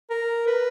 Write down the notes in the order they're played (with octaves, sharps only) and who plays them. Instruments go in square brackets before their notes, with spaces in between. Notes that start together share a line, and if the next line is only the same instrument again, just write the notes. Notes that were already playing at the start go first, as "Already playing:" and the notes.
[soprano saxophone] A#4
B4